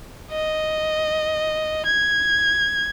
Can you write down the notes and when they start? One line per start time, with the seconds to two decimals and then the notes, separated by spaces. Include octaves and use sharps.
0.31 D#5
1.86 G#6